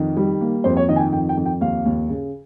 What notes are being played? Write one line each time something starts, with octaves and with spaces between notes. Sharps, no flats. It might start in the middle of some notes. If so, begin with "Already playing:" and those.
Already playing: F2 D#3
G3
A#3
F2 C5
C#5
D#3 D#5
G#5
G5
F2 G5
G5
F2
G5
D#2 F5
D#2
C#3